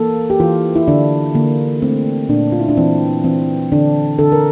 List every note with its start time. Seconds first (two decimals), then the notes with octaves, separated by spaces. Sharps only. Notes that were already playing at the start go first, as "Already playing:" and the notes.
Already playing: E3 A#3 A4
0.30 G4
0.40 E3 F4
0.76 E4
0.88 D3 D4
1.35 D3 A#3
1.82 A3 C4
2.29 A#2 D4
2.52 F4
2.60 E4
2.68 D4
2.77 E3 C4
3.24 E3 C4
3.72 D3 D4
4.19 D3 A4
4.32 A#4